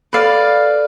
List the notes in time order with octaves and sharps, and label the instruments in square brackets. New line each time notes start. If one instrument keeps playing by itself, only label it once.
[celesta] A4 [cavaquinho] B4 D5 F5